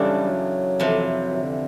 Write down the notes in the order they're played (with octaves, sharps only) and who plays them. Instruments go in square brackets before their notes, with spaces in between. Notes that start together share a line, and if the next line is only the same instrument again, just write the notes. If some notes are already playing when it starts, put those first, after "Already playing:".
Already playing: [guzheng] F#2 C#3 E3 A3 D4 [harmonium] G3
[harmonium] F#3
[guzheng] F2 C3 E3
[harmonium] D#3
D3